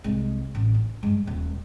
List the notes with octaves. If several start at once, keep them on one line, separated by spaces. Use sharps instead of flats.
C2 G#3
A1
D4
G2 G#3
D#1